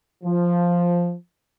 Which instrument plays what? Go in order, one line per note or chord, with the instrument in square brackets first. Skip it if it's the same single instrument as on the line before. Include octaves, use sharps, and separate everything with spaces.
[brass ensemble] F3